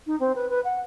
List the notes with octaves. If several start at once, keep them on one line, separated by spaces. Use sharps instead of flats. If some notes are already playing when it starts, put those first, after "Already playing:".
D#4
C4
B4
B4
F#5